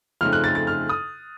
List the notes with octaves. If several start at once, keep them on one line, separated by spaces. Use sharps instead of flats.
F2 C#3 A3 C4 D#4 F6
F#6
A6
A6
F6
D#6